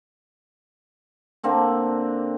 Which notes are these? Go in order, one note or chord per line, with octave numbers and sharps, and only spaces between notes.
D3 A#3 C4 D4